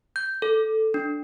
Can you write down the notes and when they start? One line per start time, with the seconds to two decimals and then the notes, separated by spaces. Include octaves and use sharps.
0.16 G6
0.42 A4
0.94 D4